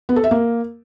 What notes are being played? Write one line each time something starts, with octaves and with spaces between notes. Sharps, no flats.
B3
A4
E5
A#3